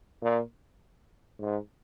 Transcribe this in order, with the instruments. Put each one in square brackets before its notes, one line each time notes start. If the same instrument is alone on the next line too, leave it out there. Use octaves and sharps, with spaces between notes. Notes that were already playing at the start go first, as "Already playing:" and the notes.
[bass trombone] A#2
G#2